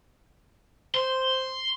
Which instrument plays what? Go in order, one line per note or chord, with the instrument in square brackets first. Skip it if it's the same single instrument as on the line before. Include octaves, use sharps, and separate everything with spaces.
[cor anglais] C5 [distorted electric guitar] C6